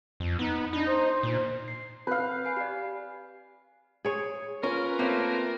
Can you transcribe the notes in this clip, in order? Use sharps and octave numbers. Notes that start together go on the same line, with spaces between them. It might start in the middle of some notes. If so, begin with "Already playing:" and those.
F2
B3 D#4
D4 D#4
C5
A#2
C7
C4 B4 F5 F#6 G6
G#5 C7
G4 D5
G#4 C#5
C#4 F4 A#4 B4
A3 A#3 C4